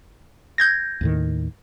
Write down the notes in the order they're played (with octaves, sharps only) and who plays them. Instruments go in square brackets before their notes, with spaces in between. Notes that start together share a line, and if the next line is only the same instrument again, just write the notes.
[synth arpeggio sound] G6 G#6 A#6
[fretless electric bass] D#2 A2 D#3